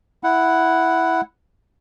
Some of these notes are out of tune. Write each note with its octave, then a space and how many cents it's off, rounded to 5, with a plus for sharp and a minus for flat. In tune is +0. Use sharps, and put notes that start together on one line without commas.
E4 +0 F#5 +0